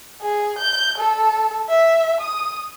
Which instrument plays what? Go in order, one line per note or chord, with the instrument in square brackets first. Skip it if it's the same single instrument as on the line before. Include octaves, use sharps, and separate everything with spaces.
[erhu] G#4
G6
A4
E5
D#6